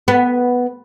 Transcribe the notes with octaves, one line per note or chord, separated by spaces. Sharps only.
B3